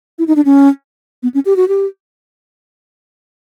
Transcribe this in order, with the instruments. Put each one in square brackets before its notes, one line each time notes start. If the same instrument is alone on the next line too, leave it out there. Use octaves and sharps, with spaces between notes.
[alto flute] E4
D#4
D4
C#4
B3
C#4
G4
F#4
G4